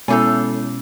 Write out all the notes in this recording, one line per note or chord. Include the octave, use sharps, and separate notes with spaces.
B2 G#3 B3 C#4 E4 A4 G#5